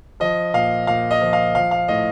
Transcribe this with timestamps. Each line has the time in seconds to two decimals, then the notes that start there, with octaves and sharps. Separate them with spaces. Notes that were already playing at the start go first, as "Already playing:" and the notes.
0.20 F3 D#5
0.54 A#2 F5
0.87 A#2 F5
1.11 D#5
1.21 F3
1.33 F5
1.55 F3 F5
1.71 F5
1.88 A2 D#5